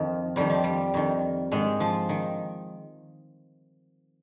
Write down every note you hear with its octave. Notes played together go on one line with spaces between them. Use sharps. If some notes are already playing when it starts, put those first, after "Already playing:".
Already playing: F2 D#3 F3
F2 D#3 G3
F3
G3
F2 D#3
G#2 D#3 G#3
F3
D#3